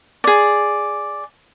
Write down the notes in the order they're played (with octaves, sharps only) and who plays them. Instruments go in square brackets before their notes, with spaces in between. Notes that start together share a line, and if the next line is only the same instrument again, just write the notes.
[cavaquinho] G#4 D5